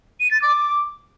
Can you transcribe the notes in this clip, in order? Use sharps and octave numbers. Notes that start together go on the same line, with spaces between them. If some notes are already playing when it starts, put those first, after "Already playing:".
D#7
A6
D6